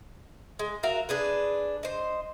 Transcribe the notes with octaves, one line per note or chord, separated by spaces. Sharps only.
G#3
F#4 A#4 E5 F5
D4 G#4 B4
C5 D#5